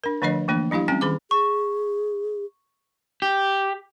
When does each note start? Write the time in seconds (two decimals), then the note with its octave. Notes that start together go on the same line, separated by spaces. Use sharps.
0.04 D4 A#4
0.22 D3 F3 A3 D4 C#5 D#5
0.48 E3 A3 A#3 D4
0.71 F#3 D4 E4 G4 F5
0.88 G3 C4 C#4 G5
1.01 D#3 G#4 B5 D6
1.31 G#4 C#6
3.22 G4